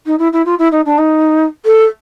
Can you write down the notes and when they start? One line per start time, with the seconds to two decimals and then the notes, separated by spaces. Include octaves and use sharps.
0.06 D#4
0.19 E4
0.33 E4
0.45 F4
0.59 E4
0.72 D#4
0.86 D4
0.98 D#4
1.65 A4